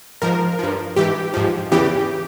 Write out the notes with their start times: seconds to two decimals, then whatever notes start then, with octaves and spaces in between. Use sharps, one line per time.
0.22 G#2 F3 A#4
0.59 G2 F3
0.96 G#2 E3 G4
1.34 G#2 F3
1.71 E2 C#3 E3 G4